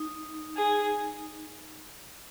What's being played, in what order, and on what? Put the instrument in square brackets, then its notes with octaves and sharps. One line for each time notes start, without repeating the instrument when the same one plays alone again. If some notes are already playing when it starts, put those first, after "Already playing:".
Already playing: [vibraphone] D#4
[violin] G#4